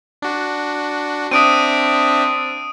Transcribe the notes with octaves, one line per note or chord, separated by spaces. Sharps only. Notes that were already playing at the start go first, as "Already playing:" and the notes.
D4 F#4
C4 D4 E5 D#6 D7 D#7